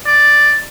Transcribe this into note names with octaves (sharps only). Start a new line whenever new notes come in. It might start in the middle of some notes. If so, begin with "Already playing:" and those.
D5